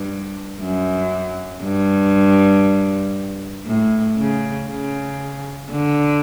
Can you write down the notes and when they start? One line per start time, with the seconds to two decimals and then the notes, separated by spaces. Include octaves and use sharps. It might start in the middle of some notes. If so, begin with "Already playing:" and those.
Already playing: G2
0.61 F#2
1.63 G2
3.66 A2
4.18 C#3
4.68 C#3
5.70 D3